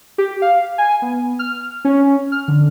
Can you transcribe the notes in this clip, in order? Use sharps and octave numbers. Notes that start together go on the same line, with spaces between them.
G4
F5
G#5
B3
F6
C#4
F6
D3